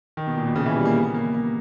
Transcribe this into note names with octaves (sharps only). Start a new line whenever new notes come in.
D#3
B2
A#2
B2
C#3
E3
G3
A#3
B3
A#3
A#3